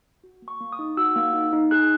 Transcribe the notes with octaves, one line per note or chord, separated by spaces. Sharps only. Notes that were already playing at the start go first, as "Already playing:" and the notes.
F#4
A#3
C#6
A#3
D#6
D#4
F#4 E6
A#3
D#4
D#4
G#4 F#6